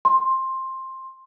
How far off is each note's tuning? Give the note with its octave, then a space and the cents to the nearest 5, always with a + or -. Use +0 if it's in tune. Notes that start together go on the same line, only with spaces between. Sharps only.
C6 +10